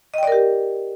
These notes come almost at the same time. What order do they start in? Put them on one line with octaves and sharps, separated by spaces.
D#5 G5 D5 A#4 G4